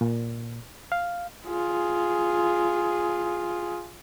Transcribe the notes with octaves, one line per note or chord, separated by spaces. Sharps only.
A#2
F5
F4 G#4